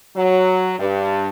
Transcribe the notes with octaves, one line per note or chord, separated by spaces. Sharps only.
F#3
G2